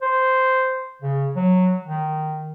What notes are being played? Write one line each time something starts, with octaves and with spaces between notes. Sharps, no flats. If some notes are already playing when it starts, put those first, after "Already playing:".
C5
C#3
F#3
D#3